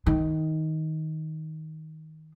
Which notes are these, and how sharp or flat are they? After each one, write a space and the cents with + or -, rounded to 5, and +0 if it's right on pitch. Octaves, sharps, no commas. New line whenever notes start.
D#3 +15